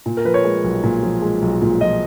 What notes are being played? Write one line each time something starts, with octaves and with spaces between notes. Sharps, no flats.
A#2
A#4
F3 B4
C#5
G#3
B1
A#2
F3
G#3
B1
A#2
F3 D#5